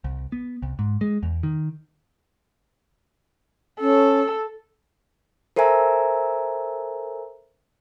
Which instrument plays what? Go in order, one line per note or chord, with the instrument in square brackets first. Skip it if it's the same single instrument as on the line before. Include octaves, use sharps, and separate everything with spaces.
[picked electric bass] C2
B3
C2
G#2
G#3
E2
D#3
[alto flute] C#4 [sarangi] A4
[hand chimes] A4 A#4 C5 E5 G#5 A#5